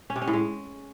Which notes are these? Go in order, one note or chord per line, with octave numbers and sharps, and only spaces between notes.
C#4
C3
C#4
A2
G#3